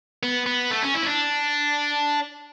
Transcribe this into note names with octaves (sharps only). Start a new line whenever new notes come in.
B3
B3
A3
C#4
E4
C#4
D4